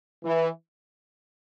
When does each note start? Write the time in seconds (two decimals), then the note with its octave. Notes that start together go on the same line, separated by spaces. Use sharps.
0.24 E3